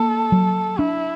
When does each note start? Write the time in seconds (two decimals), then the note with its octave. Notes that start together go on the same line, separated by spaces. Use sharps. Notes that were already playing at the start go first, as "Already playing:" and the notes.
Already playing: A#3 A4
0.32 F#3
0.79 D4 E4